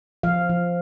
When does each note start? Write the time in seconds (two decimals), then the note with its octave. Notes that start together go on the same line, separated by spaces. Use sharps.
0.23 F3 F5
0.49 F3